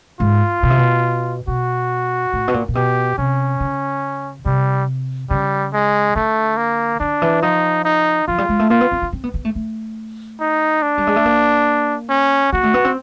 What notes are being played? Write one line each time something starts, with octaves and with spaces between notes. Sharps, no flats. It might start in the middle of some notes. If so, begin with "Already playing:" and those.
G#2 F4
B2
C3
B2
B2 F#4
A2
B2
A#2
A#2
B2 G4
C3 C#4
C#3
C3 G3
C#3 G3
G#3
D3 A3
A#3
D3 D4
E3
F3 D#4
D#4
F3 F4
G3
G#3
A3
A#3 F4
B3
C4
C4
C4
B3
B3
A3
A3
D#4
D4
G3
G#3
A3
A#3
C#4
A#3 F#4
A3
B3
C4